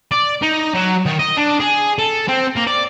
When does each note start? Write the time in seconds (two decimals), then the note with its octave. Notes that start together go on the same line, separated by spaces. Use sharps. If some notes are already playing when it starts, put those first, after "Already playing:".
0.12 D5
0.42 D#4
0.74 F#3
1.06 D#3
1.19 D#5
1.37 D4
1.60 G#4
1.99 A4
2.28 C4
2.56 A#3
2.67 D5